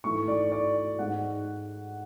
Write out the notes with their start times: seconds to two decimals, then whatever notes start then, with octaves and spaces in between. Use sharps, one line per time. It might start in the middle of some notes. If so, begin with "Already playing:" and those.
0.04 G#2 E3 A3 C#6
0.28 D5
0.52 D5
0.99 G#2 G#3 F#5